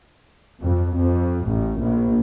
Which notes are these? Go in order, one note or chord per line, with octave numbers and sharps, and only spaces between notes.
F2
F2
A1
A#1